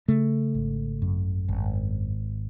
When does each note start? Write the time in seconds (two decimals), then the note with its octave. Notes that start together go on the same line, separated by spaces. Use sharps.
0.08 C#3 A3
0.55 G#1
1.02 F#2
1.48 G#1